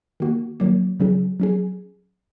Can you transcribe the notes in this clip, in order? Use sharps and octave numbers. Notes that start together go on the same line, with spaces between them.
D#3 A#3 F#4
D#3 F#3 A#3
C#3 F#3 C#4 G#4
F#3 C#4 G#4